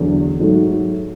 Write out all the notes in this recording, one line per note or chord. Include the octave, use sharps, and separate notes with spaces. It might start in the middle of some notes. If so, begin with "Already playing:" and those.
Already playing: E2 D3 F#3
G#2 F#3 A3